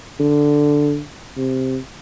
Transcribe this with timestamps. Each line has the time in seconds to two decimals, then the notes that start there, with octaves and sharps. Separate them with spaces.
0.20 D3
1.37 C3